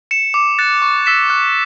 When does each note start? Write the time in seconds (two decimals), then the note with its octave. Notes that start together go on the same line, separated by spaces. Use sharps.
0.11 C#7 E7
0.34 D6
0.59 F#6 A6 C#7
0.82 C#6
1.06 E6 B6 E7
1.30 F#6